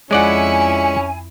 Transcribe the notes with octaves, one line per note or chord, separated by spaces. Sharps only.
F2 G#3 C#4 E4 D5 F#5 G#5 C#7